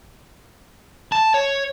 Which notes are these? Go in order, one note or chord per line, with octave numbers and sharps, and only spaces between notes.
A5
C#5